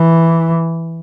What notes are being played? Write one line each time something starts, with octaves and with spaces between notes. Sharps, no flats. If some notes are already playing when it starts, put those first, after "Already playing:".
Already playing: E3